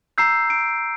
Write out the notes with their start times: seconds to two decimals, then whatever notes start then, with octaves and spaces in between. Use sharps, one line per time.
0.18 A#5 E6 G6 C7
0.50 D7